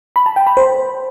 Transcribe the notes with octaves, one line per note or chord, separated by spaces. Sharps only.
B5
A5
G5
B5
C5